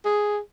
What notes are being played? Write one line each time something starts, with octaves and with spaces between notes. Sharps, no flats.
G#4